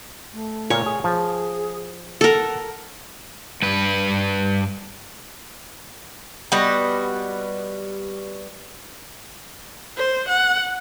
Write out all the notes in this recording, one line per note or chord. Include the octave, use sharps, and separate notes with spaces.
A3
A#2 A#4 C#5
G#4
F3 G#4
A4 A#4 F#5
G2 B4
G3 B3 F#4 D#5
C5
F#5